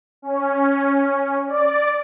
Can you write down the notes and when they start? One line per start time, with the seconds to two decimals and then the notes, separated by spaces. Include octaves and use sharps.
0.22 C#4
1.47 D5